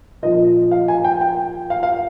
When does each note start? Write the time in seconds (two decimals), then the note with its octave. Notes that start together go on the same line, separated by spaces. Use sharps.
0.22 A#2 F3 D#5
0.71 F5
0.88 G#5
1.04 G5
1.21 G5
1.70 F5
1.83 F5